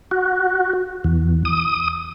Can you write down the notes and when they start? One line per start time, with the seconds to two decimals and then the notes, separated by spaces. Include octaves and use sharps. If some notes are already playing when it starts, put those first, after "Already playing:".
0.11 F#4
1.04 E2
1.45 D#6